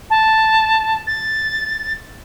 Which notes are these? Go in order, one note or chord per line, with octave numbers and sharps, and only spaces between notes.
A5
A6